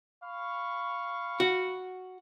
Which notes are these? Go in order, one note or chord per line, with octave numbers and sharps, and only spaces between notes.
F5 B5 C#6
F#4